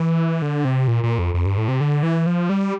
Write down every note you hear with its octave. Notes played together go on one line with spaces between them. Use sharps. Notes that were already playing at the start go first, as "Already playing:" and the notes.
Already playing: E3
D3
C3
A#2
A#2
F2
F2
G2
A2
C3
D3
E3
F3
G3